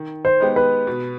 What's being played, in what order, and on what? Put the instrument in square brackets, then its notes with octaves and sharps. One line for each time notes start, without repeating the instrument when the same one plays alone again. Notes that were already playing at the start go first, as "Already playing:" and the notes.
Already playing: [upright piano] D#3
[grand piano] C5
[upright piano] G#3 B3 D#4 G4
[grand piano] B4
[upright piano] B2